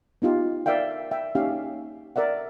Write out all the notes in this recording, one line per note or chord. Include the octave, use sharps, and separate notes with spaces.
B3 D#4 F4 G4
A#4 D5 E5 F5 G5
E5 G5
A#3 C#4 D#4 G4 F5
A#4 D5 E5 F#5